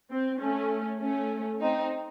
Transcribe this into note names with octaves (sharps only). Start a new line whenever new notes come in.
C4
A3 C#4
A3 C#4
C4 D#4